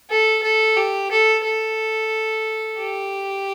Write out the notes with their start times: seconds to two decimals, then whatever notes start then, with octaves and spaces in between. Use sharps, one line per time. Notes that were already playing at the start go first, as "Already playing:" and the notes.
0.10 A4
0.43 A4
0.77 G4
1.12 A4
1.44 A4
2.79 G4